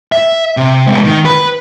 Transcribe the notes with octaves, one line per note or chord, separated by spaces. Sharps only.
E5
C3
G#2 B3
D#3
B4